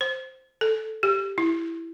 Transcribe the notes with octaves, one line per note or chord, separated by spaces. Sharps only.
C5
A4
G4
E4